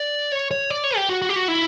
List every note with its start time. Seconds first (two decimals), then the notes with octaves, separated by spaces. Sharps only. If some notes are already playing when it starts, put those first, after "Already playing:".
Already playing: D5
0.32 C#5
0.51 C#5
0.70 D5
0.84 C#5
0.96 G4
1.09 F#4
1.22 F#4
1.29 G4
1.36 F#4
1.48 E4